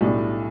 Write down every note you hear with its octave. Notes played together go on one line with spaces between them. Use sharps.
B1 A2 G3 D4